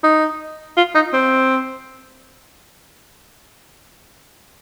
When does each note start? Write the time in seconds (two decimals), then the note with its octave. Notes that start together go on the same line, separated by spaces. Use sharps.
0.03 D#4
0.77 F4
0.95 D#4
1.13 C4